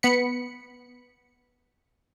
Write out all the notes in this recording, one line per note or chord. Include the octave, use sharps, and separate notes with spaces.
B3 B5 C#7